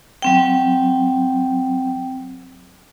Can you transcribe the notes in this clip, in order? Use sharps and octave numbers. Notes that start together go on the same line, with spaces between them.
F#3 C4 G5